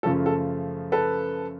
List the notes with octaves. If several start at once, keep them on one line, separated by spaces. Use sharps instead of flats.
F#2 C#3 F3 A3 A4
A4
A4 B4